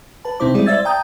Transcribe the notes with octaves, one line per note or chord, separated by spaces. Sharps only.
B4 A5
C3 C4 D#4 E4 C5 D6
G3 G#3 C4 E4 G#4 D5
C5 D5 E5 E6 G#6 A6
G5 A5 A#5 D#6 G6